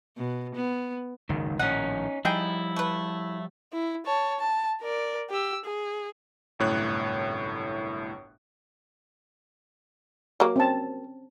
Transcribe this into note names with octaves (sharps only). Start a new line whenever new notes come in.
B2
B3
F#1 C#2 G#2 D#3
A#1 A2 D#3 C#4 D#4 F#5
F3 G3 D#4 E4 G#4 G5
A3 B4
E4
C#5 A5
A5
A#4 D5
G4 E6
G#4
G1 C2 F#2 A2 C#5 F#6
F#3 A#3
C4 C#4 A5